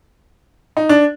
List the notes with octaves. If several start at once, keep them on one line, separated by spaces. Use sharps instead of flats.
D#4
D4